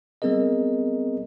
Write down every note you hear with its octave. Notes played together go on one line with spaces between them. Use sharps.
G3 B3 C4 G#4 A#4 D#5